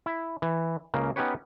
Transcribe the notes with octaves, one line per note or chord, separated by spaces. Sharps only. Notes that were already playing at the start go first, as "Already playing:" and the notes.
E4
E3
C#2 C#3 A#3
B3 C#4 D#4 G4 B4 C#5